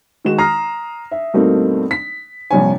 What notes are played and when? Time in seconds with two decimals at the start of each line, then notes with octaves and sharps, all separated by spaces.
0.25 D#3 G#3 D#4 F#4 E7
0.38 A#5 D#6 F6 A#6 C7
1.11 E5
1.34 G2 B2 A3 A#3 C4 D#4
1.91 B6
2.51 A#1 G2 C3 C#5 G#5